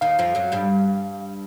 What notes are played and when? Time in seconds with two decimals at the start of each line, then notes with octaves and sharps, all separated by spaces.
0.01 D#2 D#3 F5
0.19 F2 F3
0.35 F#2 F#3
0.52 G2 G3